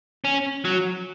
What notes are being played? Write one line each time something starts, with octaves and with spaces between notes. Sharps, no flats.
C#4
F#3